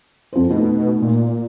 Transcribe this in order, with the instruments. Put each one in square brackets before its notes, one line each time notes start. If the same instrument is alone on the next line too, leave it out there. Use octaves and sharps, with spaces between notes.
[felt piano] F2 C5
[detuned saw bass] B2 [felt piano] A3 D#4
[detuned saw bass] A#2